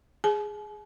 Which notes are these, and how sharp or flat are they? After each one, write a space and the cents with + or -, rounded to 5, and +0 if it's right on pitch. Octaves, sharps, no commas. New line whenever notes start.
G#4 +0 G#5 +45